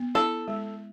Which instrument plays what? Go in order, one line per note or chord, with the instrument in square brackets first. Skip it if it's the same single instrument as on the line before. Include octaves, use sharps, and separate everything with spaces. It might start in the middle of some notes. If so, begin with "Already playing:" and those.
Already playing: [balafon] B3
[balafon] E4 [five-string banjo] A4
[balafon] G#3